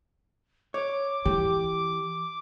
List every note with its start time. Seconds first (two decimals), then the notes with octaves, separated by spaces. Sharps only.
0.74 C#5 D6
1.25 E3 G4